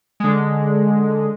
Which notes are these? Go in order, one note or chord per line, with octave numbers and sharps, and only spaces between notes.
D3 G#3